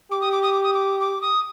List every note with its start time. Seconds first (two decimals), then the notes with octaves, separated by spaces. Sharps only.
0.11 G4 D6
0.21 D#6
0.31 D6
0.43 D#6
0.53 D6
0.63 D#6
0.73 D6
1.00 D6
1.21 D#6